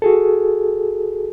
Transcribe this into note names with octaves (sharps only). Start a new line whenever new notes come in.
F#4 G#4 A4